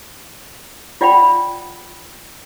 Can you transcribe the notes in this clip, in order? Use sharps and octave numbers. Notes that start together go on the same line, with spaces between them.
F4 D5 F#5 G5 B5